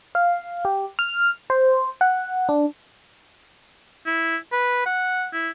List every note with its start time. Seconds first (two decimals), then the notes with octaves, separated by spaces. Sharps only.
0.15 F5
0.65 G4
0.99 F6
1.50 C5
2.01 F#5
2.49 D4
4.06 E4
4.52 B4
4.86 F#5
5.33 E4